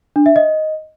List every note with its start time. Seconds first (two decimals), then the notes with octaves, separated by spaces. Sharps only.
0.16 D4
0.26 E5
0.36 D#5